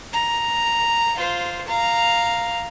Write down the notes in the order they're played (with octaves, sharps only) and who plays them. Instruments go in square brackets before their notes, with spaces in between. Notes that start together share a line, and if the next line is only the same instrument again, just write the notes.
[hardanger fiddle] A#5
F4 C5
F5 A#5